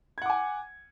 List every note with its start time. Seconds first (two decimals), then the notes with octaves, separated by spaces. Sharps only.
0.18 G#6
0.22 F#5
0.26 D6
0.30 G#5